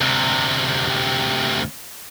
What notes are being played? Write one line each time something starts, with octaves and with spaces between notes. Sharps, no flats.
D2 C3